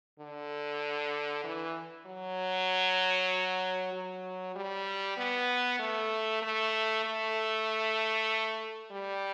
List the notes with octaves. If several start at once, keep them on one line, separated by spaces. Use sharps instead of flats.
D3
E3
F#3
F#3
G3
B3
A3
A3
A3
G3